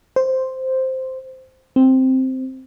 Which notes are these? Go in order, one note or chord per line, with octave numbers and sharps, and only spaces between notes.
C5
C4